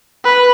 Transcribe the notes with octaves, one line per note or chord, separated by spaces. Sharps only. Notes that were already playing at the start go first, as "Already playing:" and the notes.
B4